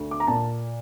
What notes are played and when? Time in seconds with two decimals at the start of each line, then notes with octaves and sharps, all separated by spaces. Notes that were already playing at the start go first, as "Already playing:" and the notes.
Already playing: D2
0.11 D6
0.20 A#5
0.27 A#2 A5